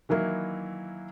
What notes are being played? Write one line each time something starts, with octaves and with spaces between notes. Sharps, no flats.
D#3 E3 F#3 A#3 E4